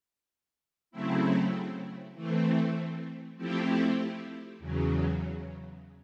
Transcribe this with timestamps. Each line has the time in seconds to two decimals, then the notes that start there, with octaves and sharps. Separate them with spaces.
0.91 C#3 F#3 A3 C4 E4
2.14 E3 A3 C4
3.36 F3 A3 C4 E4 G4
4.59 E2 C#3 F#3